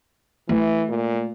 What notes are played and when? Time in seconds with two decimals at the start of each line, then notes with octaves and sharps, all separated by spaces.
0.49 E3 A3
0.89 A#2